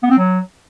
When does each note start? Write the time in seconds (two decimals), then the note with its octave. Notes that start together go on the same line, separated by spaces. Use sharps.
0.03 B3
0.10 C4
0.18 F#3